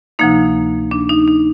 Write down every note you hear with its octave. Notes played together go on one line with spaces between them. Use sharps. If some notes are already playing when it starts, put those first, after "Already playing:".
D2 C3 F3 A#3 D#4
D4
D#4
D#4